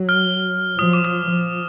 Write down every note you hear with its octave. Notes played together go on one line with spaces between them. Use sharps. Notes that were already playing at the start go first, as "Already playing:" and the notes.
Already playing: F#3
F6
F3 D#6
D6
D#6
F3